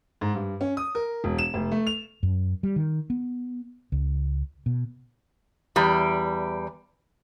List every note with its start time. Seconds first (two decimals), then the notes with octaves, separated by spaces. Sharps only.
0.21 G#2
0.34 G2
0.61 C#4
0.77 D#6
0.95 A#4
1.24 E1
1.38 E7
1.54 F1
1.72 A3
1.87 F7
2.23 F#2
2.63 G3
2.76 D#3
3.10 B3
3.92 C#2
4.66 B2
5.76 E2 G3